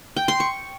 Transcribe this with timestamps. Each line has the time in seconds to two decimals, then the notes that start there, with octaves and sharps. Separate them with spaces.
0.17 G5
0.28 C6
0.40 C#6